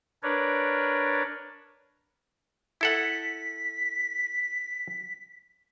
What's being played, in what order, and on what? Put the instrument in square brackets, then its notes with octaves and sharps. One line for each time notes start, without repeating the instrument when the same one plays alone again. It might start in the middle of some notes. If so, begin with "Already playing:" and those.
[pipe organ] D4 A#4 B4 C#5 D5
[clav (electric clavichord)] E4 A4 F#5 [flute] B6